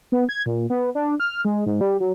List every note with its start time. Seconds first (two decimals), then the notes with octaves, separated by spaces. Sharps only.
0.12 B3
0.29 G#6
0.46 A#2
0.70 B3
0.95 D4
1.20 F6
1.45 G#3
1.66 G#2
1.81 G3
2.00 F#3